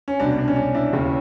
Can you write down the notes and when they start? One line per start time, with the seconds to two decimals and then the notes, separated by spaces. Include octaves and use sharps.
0.08 C#4
0.20 C2 B2 D4
0.38 D4
0.48 C#4
0.56 D4
0.74 D4 E4
0.93 D#2 C#3 E3